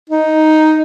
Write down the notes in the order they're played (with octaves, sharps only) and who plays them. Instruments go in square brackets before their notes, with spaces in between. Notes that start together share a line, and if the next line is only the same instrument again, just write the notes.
[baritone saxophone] D#4